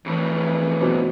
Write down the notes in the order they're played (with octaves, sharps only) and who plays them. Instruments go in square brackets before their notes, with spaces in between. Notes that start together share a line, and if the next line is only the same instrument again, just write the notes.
[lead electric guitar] F2 A2 [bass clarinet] E3
[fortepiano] B2 F3 F#3